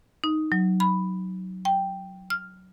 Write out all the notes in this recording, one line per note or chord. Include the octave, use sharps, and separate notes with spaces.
D#4
F#3
B5
G5
F6